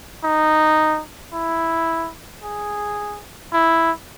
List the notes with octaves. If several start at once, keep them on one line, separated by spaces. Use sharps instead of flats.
D#4
E4
G#4
E4